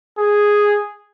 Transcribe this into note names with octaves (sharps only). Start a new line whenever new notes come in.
G#4